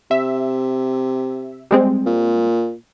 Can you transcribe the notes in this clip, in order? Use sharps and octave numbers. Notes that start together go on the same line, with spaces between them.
C3 E5
G3 G#3 C4
A#2